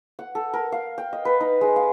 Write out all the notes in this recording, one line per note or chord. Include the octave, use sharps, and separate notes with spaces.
F#5
A4
A#4
F5
G5
D#5
B4
D#4
G#3
F5